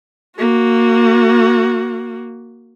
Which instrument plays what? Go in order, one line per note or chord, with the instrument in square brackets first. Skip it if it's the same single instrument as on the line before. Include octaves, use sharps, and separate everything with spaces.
[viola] A#3 F#4